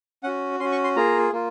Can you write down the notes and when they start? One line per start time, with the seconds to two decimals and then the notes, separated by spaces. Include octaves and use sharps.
0.23 C#4 F#4 F#5
0.60 C#4 C6
0.65 F#4
0.72 C#6
0.84 C6
0.96 A#3 F4 G#4 A#5
1.32 A#3 F4